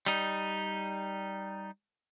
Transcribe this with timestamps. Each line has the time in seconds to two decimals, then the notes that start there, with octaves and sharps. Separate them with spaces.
0.06 G3 D#4